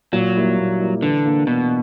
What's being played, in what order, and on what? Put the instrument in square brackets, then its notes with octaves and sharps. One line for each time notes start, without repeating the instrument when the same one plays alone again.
[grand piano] A#2 [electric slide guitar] F#3
[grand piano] G3 A#3 E4
A#2
G3 A#3 E4
[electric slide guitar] D3 [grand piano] E3
[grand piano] A#3 D4
[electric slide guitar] B2 [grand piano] E3